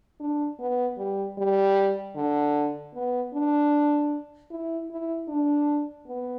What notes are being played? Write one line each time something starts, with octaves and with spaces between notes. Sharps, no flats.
D4
B3
G3
G3
D3
B3
D4
E4
E4
D4
B3